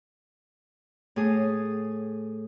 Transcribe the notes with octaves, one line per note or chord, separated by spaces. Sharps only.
A2 G#4 D#6